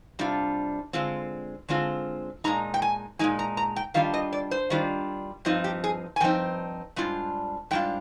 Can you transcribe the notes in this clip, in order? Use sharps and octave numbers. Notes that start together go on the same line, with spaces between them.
C3 G3 D4 F4
D3 G#3 C4 F4
D3 G#3 C4 F4
A#2 G#3 D#4 A#5
G5
G#5
A#2 G#3 D#4 G#5
A#5
A#5
G5
D#3 G3 D4 F4 F5
D#5
D5
C5
D#3 G3 D4 F4
G2 F3 C4 D#4 F4
G4
G#4
G#5
G2 F3 C4 D#4 G5
G#2 G3 D4 F4
G#2 G3 D4 F4 G5